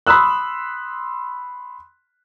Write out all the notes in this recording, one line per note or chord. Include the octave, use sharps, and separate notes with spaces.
B5 C6 D#6 E6 F#6